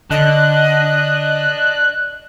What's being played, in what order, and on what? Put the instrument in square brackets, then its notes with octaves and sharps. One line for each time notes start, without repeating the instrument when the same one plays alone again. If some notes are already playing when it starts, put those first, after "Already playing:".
[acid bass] D3 [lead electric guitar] D5 A5 [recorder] D#5 [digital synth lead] F#6